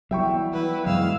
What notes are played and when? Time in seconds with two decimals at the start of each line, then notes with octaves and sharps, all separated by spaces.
0.11 E3 F#3 G3 B3 E5 G5 C#6
0.52 E4 B4
0.86 F#2 E3 F#3 G#3 B3 F5 E6